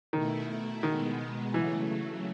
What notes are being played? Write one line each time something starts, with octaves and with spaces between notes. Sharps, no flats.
B2 D#3 A3 E4
B2 D#3 G#3 B3
C#3 E3 F#3 A3